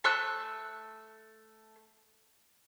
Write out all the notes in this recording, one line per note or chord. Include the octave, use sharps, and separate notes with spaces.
A3 E6 F#6